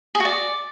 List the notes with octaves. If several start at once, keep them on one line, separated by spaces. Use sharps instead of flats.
G#4
F#4
D5